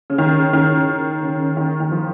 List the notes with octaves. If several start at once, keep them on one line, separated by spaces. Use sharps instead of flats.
C#3
D#3
C#3
D#3
C#3
D#3
D#3
F3